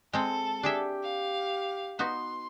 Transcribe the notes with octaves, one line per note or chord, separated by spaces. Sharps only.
G#3 C4 A4
D4 G4 G#4 E5
F5
B3 D#4 F#4 C6